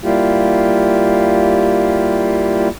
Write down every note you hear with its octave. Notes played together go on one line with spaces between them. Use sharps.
G3 A#3 E4 F4 G4